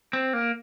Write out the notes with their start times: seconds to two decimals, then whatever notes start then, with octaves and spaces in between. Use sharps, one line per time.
0.13 C4
0.33 A#3